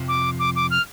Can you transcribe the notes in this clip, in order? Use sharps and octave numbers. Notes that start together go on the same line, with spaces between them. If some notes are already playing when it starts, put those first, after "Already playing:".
Already playing: F2 C3 F3
D6
D6
D6
F6